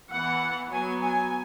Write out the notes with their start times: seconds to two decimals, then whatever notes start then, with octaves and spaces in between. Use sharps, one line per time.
0.12 E3 B3 F#5
0.71 F#3 B3 G#5
1.02 G#5